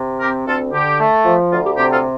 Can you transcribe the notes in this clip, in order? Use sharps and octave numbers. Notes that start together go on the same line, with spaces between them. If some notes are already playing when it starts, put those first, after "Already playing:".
Already playing: C3
C4 G4 A#4
D2 F4 A4
D3 G4
A3
F3
D2 F4
G4
C3 G4
F4 A4